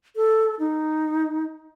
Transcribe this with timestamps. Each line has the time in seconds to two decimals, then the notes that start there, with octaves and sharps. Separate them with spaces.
0.16 A4
0.60 D#4